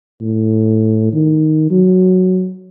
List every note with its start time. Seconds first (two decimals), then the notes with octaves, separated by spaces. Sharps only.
0.21 A2
1.13 D#3
1.71 F#3